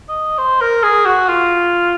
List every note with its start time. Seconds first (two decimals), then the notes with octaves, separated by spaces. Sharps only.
0.09 D#5
0.38 C5
0.61 A#4
0.84 G#4
1.05 F#4
1.28 F4